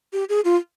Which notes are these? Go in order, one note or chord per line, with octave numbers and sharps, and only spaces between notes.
G4
G#4
F4